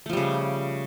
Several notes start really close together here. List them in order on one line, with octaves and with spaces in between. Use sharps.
A3 F3 G3 C#3